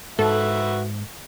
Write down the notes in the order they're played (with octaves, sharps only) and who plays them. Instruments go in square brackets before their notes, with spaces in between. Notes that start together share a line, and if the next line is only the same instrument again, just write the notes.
[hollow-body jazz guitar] G#2 [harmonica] F#4 B4 E5 [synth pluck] A4